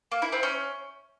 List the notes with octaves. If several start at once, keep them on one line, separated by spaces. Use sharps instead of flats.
A#3
E4
C4
C#4